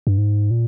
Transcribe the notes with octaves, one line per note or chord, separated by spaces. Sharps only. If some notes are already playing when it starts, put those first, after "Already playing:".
G2
G#2
A#2